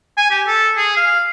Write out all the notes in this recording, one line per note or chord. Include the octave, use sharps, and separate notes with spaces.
G#5
G4
A4
G#4
F5